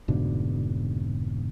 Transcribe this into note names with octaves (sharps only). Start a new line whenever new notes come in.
F1 G#2 B2 D3